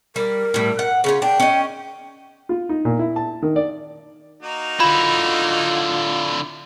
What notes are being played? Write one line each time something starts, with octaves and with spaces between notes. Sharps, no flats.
G3 A#4
A2 G3
F#5
C#3 C#4 F4
D4 G5
C#4 D#5
F4
D#4
A#2
E4
A5
D#3
D5
A#3 D#4 F#4
D3 E4 F4 B5